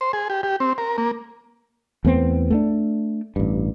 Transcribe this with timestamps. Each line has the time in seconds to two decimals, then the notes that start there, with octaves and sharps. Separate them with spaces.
0.01 C5
0.13 G#4
0.30 G4
0.43 G4
0.60 C4
0.78 A#4
0.98 A#3
2.05 E2 A3 B3 C4
2.50 A3 A#3 D4
3.36 A1 G2